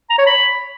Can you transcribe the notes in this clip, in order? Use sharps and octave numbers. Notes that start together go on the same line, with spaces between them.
A#5
C#5
B5